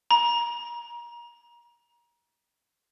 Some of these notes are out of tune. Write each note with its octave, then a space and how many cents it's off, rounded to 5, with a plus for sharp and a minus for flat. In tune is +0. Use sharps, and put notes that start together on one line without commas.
A#5 +30